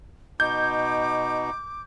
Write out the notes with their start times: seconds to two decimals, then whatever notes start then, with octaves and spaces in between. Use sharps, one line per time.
0.40 B2 D#4 D6 G6